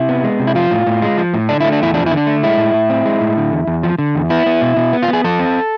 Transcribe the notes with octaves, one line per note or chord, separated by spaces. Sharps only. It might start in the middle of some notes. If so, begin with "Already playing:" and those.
Already playing: C3 E4
B3
G#3
C3
E4
F3 F4
A2
A2
G#3
F3
A2
D3 D4
A3 E4
D4
E2 E4
F3 D4
D3 E4
D4
A3
G#3 E4
A2
A2
C4
G#3
A2
D3
E2
E2
F3
D3
E2
B3 E4
B3
B2
B2
B3
F4
B3
G#4
F3 A4
C4